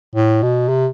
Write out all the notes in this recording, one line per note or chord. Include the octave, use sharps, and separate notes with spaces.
A2
B2
C3